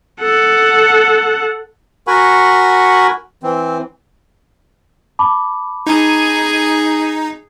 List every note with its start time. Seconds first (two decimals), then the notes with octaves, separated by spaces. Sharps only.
0.21 A4 F#5
2.07 F#4 A#4 F#5 G#5 B5 C#6
3.43 E3 C4
5.19 A5 B5 D6
5.87 D#4 G#4 G#5